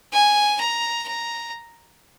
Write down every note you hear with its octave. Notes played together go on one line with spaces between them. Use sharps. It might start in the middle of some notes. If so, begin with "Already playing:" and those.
G#5
A#5
A#5